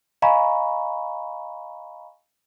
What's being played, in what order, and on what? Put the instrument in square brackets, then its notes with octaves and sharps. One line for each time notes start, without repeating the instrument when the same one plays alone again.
[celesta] D#5 F5 G#5 A#5 B5 C#6